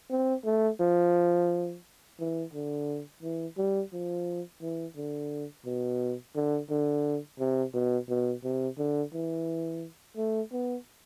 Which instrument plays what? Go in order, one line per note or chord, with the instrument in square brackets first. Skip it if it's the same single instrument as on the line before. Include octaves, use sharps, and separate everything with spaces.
[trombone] C4
A3
F3
E3
D3
E3
G3
F3
E3
D3
B2
D3
D3
C3
B2
B2
C3
D3
E3
A3
B3